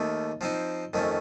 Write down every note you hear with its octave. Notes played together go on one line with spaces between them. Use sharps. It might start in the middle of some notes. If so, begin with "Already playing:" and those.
Already playing: D#2 D#3 A3
F3 C4 D#4
F2 D#3 A3 C#4